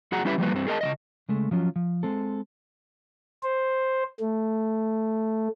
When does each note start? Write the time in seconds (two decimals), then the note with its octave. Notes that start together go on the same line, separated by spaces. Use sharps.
0.12 F#2 F#4 G#4 F#5 A#5
0.25 G3 C#4 E4 G4 B4 E5
0.38 F3 G3 A#3 B4
0.53 G2 C4
0.67 G#4 A#4 D#5 A5
0.81 C#3 E3 D#5
1.29 C#3 G#3 A3
1.51 F3 F#3 C#4 F4
1.76 F3
2.03 G#3 C4 A4
3.43 C5
4.20 A3